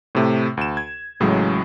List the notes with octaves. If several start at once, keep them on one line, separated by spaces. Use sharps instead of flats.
A2 C3 A3
D2 E7
G#6
A1 A2 C#3 F#3 G#3